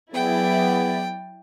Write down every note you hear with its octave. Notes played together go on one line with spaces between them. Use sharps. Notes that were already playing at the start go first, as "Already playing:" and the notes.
F#3 B3 E4 G#4 D5 G5